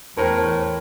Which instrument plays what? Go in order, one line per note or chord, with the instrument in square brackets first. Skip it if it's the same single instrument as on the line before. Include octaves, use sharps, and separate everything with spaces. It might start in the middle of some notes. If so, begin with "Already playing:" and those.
[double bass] E2 [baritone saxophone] A2 [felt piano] A#4 C5 G5